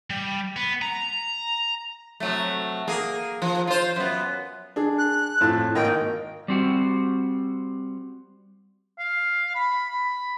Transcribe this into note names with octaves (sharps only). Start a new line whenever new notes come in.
G3
B3
A#5
C3 F#3 A3
A#3 G#4
F3
F4 C5
F#2 B3
D4 G#4
F#6
F2 A2 A5
G#1 A#3 D#5 G5
G3 C4 F#4
F5
B5
B5